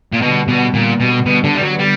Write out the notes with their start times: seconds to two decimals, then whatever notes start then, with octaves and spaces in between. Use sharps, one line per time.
0.12 A#2
0.21 B2 D3 G3 B3
0.48 B2
0.74 A#2
1.00 B2
1.26 B2
1.44 D3
1.55 G3
1.62 F#3
1.79 G3